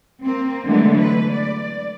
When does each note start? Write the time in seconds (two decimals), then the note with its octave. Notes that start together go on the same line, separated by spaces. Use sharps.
0.24 A#3 C4
0.68 D3 E3 F#3 G#3 A3 B3
0.99 B4
1.32 D5